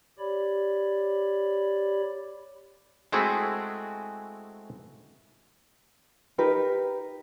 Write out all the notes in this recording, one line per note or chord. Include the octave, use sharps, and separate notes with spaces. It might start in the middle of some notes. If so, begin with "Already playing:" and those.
G4 C#5 D5 B5
G#3 A3 C4 E4 F#4 G#4
D#4 G4 A#4 B4